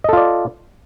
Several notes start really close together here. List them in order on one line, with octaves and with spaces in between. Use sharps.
D#5 A4 F4 D5